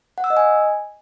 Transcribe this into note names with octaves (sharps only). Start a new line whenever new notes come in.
F#5
E6
D#5
G#5